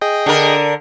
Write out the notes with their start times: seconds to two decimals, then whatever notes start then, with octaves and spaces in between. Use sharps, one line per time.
0.01 G#4 D#5 G5
0.26 D3 A#4